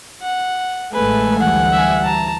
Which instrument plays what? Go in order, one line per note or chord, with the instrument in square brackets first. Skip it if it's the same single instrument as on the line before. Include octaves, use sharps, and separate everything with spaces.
[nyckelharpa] F#5
[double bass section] A1 G#3 A3 [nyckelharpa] A4 G#5 [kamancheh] B4
[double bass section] D2 E3 G3 [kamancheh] F#5
[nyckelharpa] E5 G#5
A5 A#5